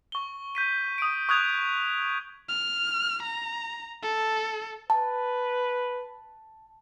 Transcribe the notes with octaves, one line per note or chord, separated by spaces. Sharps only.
C#6 G7
G6 B6 D#7
D#6 D7
C#6 D#6 F#6 G#6 F7
F6
A#5
A4
B4 A5